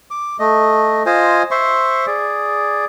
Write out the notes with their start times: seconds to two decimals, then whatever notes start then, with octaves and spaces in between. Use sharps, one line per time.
0.11 D6
0.39 A3 D#5
1.06 F4 C5 D#5 G#5
1.51 C5 E5 C6 C#6
2.07 G#4 D5